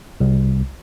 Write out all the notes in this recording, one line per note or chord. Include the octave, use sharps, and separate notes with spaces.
C2